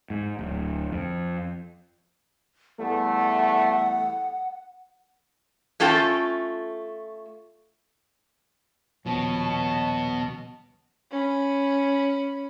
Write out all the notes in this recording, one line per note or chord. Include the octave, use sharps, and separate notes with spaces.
G#2
D1
F2
E2 G3 A3 F#5
A3 C#4 F4 A4 G5
D#1 B2 F3 C#5 A5
C#4 B5